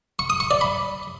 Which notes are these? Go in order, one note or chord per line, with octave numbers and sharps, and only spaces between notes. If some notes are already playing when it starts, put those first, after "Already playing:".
C#6
D#6
C#6
D5
B5